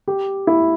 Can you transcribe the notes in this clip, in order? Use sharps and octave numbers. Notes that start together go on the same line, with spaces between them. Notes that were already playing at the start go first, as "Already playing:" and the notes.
G4
E4